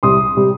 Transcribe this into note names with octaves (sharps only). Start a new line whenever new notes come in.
C2 C3 G3 C6 D#6
C3 G3